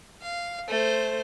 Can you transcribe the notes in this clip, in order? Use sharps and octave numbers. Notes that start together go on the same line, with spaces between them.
F5
A3 C5